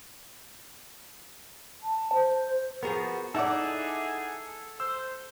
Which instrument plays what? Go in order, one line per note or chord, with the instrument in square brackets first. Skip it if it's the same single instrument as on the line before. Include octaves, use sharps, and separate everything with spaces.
[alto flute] A5
C5
[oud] F3 G#4 A#4 [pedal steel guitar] B3 F#4
[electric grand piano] D#4 F#5 D6 [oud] E4 D5 [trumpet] G#4 [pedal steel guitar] A4 E5
[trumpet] C5 [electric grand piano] E6